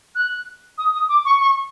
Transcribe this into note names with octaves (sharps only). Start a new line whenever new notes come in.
F#6
D#6
D#6
D6
C#6
C#6